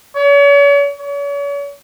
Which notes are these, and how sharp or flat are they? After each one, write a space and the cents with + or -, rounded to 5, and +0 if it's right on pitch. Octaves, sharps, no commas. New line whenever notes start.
C#5 +40
C#5 +40